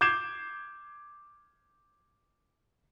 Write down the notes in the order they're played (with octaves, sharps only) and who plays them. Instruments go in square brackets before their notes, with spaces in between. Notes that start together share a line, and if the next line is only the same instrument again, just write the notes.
[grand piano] D6 G6 G#6 C7 E7